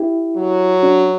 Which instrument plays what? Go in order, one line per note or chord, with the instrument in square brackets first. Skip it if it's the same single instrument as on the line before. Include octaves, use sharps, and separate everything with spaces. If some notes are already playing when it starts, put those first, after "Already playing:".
Already playing: [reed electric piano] E4 G4
[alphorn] F#3
[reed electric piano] D4 F#4